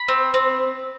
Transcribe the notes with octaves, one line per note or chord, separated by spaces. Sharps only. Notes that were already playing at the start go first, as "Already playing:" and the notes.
Already playing: B5
C4
C4